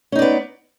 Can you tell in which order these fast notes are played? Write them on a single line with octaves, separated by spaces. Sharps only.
C#4 D#4 D5 B3